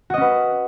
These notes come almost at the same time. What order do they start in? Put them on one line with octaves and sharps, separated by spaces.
F#4 D#5 C#4 B4